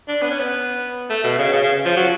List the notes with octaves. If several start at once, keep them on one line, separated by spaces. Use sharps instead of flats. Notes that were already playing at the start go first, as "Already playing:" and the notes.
D4
B3
C#4
B3
A3
B2
C#3
C#3
C#3
F3
F#3